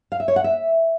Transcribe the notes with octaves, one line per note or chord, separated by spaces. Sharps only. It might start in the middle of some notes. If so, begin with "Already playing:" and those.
F5
E5
C#5
F#5
E5